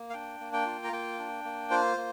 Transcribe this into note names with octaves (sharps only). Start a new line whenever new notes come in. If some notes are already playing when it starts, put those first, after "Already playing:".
Already playing: A#3
F5
D4 G5
A#3
G5
F4
A#5
A#3 G5
D4
A#3
F4 C5
A#3